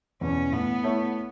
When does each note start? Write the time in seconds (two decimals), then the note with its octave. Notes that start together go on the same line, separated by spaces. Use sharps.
0.21 E2 B2 C#4
0.52 A2 B3
0.84 A3 E4 C#5